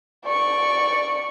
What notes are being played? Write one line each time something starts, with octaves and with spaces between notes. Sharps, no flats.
D5 C#6